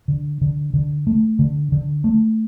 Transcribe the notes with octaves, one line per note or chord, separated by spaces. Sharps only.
D3
D3
D3
A3
D3
D3
A3